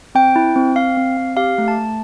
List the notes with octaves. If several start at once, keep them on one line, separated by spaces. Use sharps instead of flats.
C4 G5
E4
C4
C4 F5
C4
C4
G4 F5
A3
A5
A3